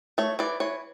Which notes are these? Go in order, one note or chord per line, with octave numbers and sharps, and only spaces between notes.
A3 C#5
E3 D5
E3 C#5